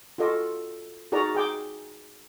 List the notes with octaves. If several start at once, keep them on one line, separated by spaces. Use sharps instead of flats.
F4 F#4 A4 D#5 D6
D#4 F#4 G#4 A#4 D5 A#5
G#4 G5 D6